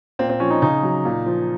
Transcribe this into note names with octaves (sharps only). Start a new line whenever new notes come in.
A#2 C4
C4
F3 C#4
D#4
C#3 D#4
F#3
A#2
F3